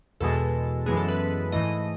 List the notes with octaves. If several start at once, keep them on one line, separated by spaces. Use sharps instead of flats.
E2 B2 G#3 A4
F#2 E3 G#3 B3 G#4
A4
B4
G#2 E3 A3 D#5